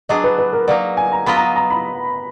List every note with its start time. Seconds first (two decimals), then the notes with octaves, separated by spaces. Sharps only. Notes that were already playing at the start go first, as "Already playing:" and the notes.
0.09 F#3 B3 D4 G#4 D#5
0.24 B4
0.38 B4
0.53 A#4
0.68 F#3 A#3 D#4 D5
0.97 G#5
1.12 A#5
1.26 F#3 B3 F4 B4 D#5 B5
1.36 A#5
1.56 A#5
1.70 B5